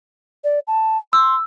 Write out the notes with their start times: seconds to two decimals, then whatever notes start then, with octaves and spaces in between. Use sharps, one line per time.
0.44 D5
0.67 A5
1.13 C6 E6